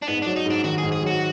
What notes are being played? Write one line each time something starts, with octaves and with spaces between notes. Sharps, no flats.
D4
G#2 B3
F#3 D4
D#4
G#2 D4
D#3 F#4
G#4
G#2
G#4
F#3 F#4